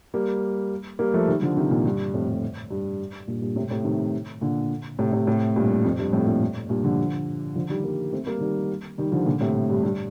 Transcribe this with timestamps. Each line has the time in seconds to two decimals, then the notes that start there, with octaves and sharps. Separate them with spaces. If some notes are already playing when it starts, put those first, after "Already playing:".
0.14 G3 A#3
0.99 G3 A#3
1.14 F3 A3
1.28 D#3 G3
1.42 D3 F3
1.57 C3 D#3
1.71 A#2 D3
1.85 G2
2.14 F2 A2
2.28 G2
2.71 G2
3.28 G2 A#2
3.41 G2 A#2
3.56 A2 C3
3.70 A2 C3
3.84 C3 D#3
4.41 A#2 D3
4.99 A2 C3
5.12 A2 C3
5.27 A2 C3
5.56 G2 A#2
5.85 F2
5.99 G2
6.13 F2 A2
6.27 G2 A#2
6.69 G2 A#2
6.84 D3 F3
7.55 D3 F3
7.69 D#3 G3
7.84 G3 A#3
8.13 A3 C4
8.26 G3 A#3
8.40 D#3 G3
8.98 D#3 G3
9.12 D3 F3
9.26 A#2 D3
9.41 A2 C3
9.70 G2
9.83 G2